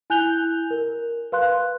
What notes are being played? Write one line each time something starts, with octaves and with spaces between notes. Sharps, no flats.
E4 G#5 F#6 G6 F7 G7
A#4
B4 F5 C6 F#6